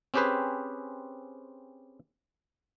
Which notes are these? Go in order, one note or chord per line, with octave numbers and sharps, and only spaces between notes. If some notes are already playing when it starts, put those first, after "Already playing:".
C4 C#4 G4 G#4 B4 C5